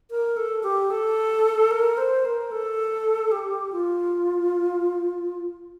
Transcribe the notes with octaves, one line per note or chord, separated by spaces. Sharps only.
A#4
A4
G4
A4
A#4
C5
A#4
A4
G4
F4